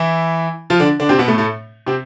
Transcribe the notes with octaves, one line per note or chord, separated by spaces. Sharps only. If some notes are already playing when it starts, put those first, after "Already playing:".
Already playing: E3 E4
F3 F4
D3 D4
D3 D4
C3 C4
B2 B3
A2 A3
A2 A3
C3 C4